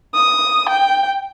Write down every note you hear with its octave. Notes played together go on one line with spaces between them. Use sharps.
D#6
G5